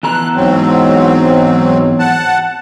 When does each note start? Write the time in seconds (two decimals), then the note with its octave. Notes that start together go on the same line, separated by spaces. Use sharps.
0.03 E2 A4 A#5 F#6
0.36 G#2 F#3 C4
1.99 F#5 A5